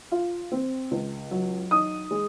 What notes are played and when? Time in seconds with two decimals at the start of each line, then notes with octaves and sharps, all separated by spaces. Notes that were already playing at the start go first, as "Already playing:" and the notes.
0.12 F4
0.52 C4
0.91 C#2
1.31 F#3
1.71 D#4 D#6
2.11 G#3